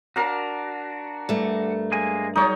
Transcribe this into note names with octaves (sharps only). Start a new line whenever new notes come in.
D4 F#4 A#4 F5 A#5
G2 A3
G#3 A#3 G#5
F#3 G3 D#4 G#4 C#5 D#5